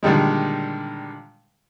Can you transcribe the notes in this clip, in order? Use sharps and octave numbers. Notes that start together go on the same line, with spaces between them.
A#2 D3 D#3 G3 G#3